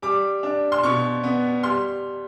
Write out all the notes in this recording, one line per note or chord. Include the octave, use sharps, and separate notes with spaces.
G3 D6
D4
C6
B2 C#6
B3
G3 C6